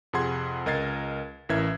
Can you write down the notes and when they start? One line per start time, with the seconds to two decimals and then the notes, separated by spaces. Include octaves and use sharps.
0.13 F2 C3 G#4 F#5 C6 G#6
0.66 C#2 A#4 D#5 G#6 A6 C7
1.49 A1 E3 C#4 A#4 E5 G#6